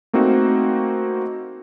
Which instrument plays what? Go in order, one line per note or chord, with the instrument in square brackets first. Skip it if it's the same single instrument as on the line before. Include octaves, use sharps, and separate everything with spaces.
[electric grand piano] A3 A#3 C4 D#4 F#4